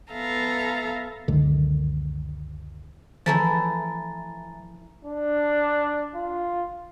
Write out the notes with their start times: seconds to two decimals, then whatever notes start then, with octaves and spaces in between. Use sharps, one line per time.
0.12 B3 A4 E5 F5 A#5
1.28 F#1 C#2 D3 D#3
3.26 E3 F3 A3 E4 G#5 A#5 A6
5.05 D4
6.16 F4